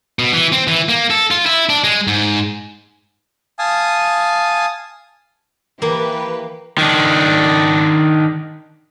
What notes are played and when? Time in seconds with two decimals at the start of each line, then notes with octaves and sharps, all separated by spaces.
0.19 B2
0.33 E3
0.52 C4
0.67 E3
0.89 A#3
1.10 A4
1.31 F4
1.46 E4
1.69 D4
1.84 G#3
2.08 G#2
3.59 F5 G#5 A5 D#6
5.82 E3 A#3 G4 B4
6.78 D#3 D4